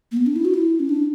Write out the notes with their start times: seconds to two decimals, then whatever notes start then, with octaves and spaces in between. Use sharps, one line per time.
0.12 A#3
0.17 B3
0.26 D4
0.36 E4
0.45 F#4
0.54 E4
0.80 C#4
0.89 D4